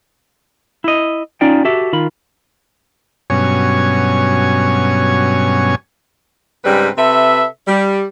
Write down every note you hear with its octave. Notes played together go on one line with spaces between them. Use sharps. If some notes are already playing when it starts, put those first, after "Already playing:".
E4 D#5
C#4 D#4 F4 D5 G5
F#4 G4 A4 E5
D#3 F4 B5
G2 B2 F#3 C#4 C#5 G#5
G#2 C#3 G3 C4 C#4 B4
C3 A4 B4 E5
G3